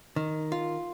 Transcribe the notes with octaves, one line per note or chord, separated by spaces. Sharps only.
D#3
F4